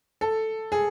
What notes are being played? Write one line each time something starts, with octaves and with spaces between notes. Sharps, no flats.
A4
G#4